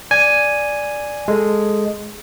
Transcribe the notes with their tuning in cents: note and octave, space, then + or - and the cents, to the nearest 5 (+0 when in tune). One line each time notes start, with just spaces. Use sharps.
D5 +0 G#5 +0
G#3 +0 A4 +0